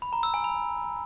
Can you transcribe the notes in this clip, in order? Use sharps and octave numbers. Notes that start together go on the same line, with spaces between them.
B5
A#5
E6
G#5
B5